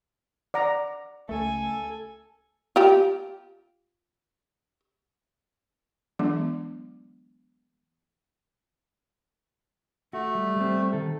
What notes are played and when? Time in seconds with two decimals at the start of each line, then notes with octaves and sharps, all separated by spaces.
0.54 D5 F#5 A#5
1.29 C#2 A3 A4 G#5
2.76 F4 G4
6.19 E3 F#3 G#3 B3 D4
10.13 A3 F#4
10.35 G3
10.56 G3 C4
10.93 D#3 A4